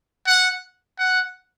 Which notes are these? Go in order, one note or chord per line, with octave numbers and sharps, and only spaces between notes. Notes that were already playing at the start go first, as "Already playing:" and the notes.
F#5
F#5